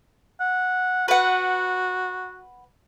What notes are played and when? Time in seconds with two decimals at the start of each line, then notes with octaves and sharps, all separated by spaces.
0.40 F#5
1.08 F#4 B4 F#5